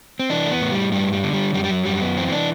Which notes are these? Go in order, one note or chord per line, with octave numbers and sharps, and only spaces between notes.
C4
E3 D4
A3
B3
A2
G3
G2 G3
G3
D3
G3
F#2 G3
G3
F#3
F#2 G3
B3
E3 C4
D4